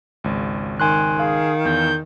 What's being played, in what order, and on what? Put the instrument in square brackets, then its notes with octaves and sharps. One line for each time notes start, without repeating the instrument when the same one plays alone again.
[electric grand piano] G#1 C#2
[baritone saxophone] D#3 [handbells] G#5 C6 F#6
[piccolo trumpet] G#4 [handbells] F5
[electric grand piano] E2 [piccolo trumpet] G6